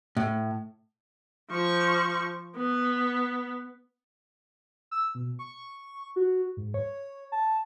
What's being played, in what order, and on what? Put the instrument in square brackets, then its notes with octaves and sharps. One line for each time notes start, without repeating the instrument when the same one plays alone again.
[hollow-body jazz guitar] A2
[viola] F3 C#6
B3
[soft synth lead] E6
B2
C#6
F#4
G#2
C#5
A5